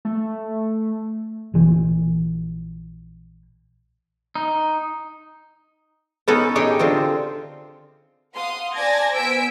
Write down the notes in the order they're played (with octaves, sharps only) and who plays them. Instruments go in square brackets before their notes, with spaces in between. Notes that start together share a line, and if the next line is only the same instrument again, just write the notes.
[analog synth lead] A3
[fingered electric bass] A#1 E3
[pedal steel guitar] D#4
[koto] B3 C#4 D#4 A4 B4
D#4 G4 G#4 C#5 D#5
D3 C4 F4 C5
[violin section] F5 F#5 C6 D#6
D5 G#5 A5 G#6 A#6
B3 C5 G#5 E6 B6 D7